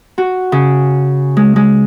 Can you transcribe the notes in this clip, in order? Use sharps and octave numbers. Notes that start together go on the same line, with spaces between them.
F#4
C#3
G#3
G#3